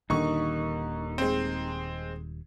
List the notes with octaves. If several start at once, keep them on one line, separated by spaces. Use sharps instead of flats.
D#1 D#2 D3 D#3 D#4 C#6
G#3 C4